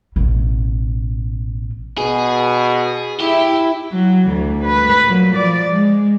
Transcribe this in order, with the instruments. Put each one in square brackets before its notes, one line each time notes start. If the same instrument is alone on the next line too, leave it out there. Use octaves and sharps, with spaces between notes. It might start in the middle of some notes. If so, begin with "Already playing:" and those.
[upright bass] A1 B2
[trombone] B2 [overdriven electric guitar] G#4
[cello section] E4 [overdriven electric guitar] G4
[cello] F#3
D2 E3
B4
A#2 F#3
F3 D5
G#3